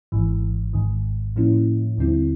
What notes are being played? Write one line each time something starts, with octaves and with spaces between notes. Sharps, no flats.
G#1 G#2 E3
G#1 G#2 D#3
A2 F3 A#3 C#4 E4
D#2 D3 G3 C4 E4